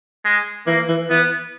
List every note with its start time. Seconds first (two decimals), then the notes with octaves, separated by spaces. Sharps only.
0.24 G#3
0.66 E3 A#3
0.88 E3
1.09 E3 B3